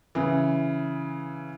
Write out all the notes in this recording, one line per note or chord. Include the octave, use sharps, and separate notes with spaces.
C#3 E3